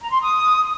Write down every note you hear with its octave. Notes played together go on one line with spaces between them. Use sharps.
A#5
C6
D#6